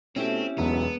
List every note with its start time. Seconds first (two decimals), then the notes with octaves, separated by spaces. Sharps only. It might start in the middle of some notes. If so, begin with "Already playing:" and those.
0.16 B2 A3 C4 C#4 E4 G4
0.58 E1 B1 B3